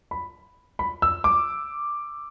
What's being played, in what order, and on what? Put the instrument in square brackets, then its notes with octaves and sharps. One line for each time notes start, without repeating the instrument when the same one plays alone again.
[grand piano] B5
B5
E6
D6